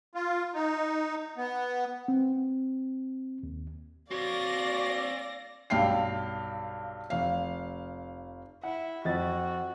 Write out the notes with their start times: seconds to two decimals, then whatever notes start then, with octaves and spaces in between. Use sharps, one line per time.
0.15 F4
0.54 D#4
1.37 B3
2.08 C4
3.43 D#2
4.11 C4 F#4 C#5 D5 F5 A#6
5.70 B1 G2 F5 G5 C7
7.10 F1 F5
8.63 E4 F#5
9.05 F2 F#4 D#5 A6